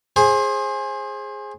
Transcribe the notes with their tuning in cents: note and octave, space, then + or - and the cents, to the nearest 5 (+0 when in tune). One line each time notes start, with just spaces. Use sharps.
G#4 +0 C5 +30